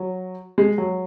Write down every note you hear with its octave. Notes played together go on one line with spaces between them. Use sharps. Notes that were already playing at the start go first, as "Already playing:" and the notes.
Already playing: F#3
G#3
F#3